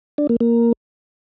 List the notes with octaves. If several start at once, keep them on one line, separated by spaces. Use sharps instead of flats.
D4
A#3
A#3